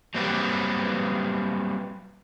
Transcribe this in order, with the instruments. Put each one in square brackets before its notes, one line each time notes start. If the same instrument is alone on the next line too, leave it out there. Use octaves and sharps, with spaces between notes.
[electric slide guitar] F#3 G3 A#3 C4 G4 B4